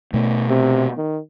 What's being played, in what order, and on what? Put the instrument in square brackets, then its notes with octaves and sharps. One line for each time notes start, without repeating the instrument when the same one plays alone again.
[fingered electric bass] B2 A3 B3
[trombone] C3
D#3